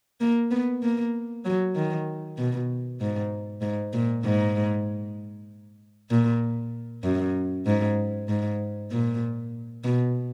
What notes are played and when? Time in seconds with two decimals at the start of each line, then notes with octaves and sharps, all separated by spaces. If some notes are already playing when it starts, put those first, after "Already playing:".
0.21 A#3
0.51 B3
0.83 A#3
1.45 F#3
1.75 D#3
2.38 B2
3.01 G#2
3.62 G#2
3.93 A#2
4.25 G#2
6.10 A#2
7.04 F#2
7.66 G#2
8.29 G#2
8.91 A#2
9.84 B2